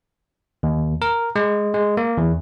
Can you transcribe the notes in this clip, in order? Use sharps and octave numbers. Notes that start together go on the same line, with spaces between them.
D#2
A#4
G#3
G#3
A#3
E2